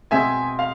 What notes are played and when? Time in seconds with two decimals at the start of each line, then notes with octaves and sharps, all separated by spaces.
0.11 B2 G#3 C4 E5 G#5
0.59 F5